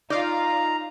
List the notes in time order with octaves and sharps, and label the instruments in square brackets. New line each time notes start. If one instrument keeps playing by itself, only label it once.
[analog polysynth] D#4 F5 [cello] F4 [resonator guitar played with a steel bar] D5 [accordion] A#5